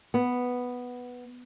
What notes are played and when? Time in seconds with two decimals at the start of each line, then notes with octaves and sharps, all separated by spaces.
0.14 B3